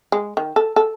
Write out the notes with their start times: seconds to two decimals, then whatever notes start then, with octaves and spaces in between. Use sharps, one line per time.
0.12 G#3
0.37 D#3
0.56 A4
0.76 A4